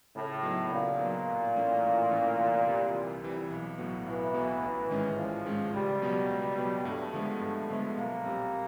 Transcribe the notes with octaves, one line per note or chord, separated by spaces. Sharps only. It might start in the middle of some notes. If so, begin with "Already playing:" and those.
A2 C#3
F#3 B3 D#4
A#2 C#3
F#3 B3 D#4
A2
E3 A3 C#4
A2
E3 A3 C#4
C2
C3 E3 G3
C2
C3 E3 G3
B1
A2 F#3 B3
B1 E3
A2 F#3 B3
A1
G#2 D#3 G#3 C#4
A1 F3
G#2 D#3 G#3 C#4
C#2 G3
B2 F#3 B3
C#2
B2 F#3 B3
G2 A3
D3 F3 G#3 B3
G2
D3 F3 G#3 B3
B1 A#3
A#2 G3 C4